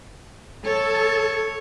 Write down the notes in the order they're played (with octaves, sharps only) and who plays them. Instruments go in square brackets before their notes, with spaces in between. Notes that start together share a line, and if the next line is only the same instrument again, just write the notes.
[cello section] A4 [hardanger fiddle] C#5